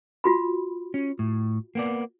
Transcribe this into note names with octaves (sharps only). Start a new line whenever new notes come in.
F4 F#4 B5
C#4
A2
A#3 B3 D5